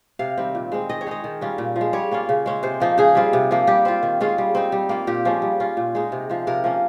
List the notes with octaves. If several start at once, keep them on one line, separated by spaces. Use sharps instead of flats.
C3 F5
D#3 G3 C4
A#2
G#3 C4
D#3 D#5
C#5
G#3 D#4 D#5
D#3
G3 C#4 F4
A#2
F3
G#3
G3 C#5
A#3 C#4 F4
C#3
G#3 C#4
C3 C5
F3 A#3 D#4
C#3 G#4
G3 C4 F4
C3
F3 A#3
G3 G4
C4 F4
D#3
G#3 C#4 F4
G3
C4 D#4
G3
A#3 F4
A#2 G4
F3 G#3 C#4
G3
C#4 F4
A#2
G#3 D#4
C3
F3 G#3
C3 A#4
F3 A#3 C#4